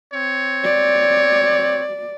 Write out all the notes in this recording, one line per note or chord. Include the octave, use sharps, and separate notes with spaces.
C4 C#5
D5